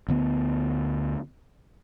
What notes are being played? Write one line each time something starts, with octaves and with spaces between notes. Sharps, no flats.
D2 D3 B3